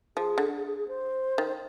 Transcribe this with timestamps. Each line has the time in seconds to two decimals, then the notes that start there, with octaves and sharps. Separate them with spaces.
0.17 F3 G#4
0.38 D3
0.57 G#4
0.67 G#4
0.77 G#4
0.88 C5
1.38 D#3